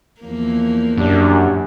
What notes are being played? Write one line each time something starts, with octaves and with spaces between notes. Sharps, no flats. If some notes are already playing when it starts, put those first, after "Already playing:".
E2 F3 A#3
F#2 D4 G4